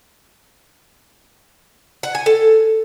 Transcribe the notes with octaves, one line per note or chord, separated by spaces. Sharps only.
F#5
G#5
A4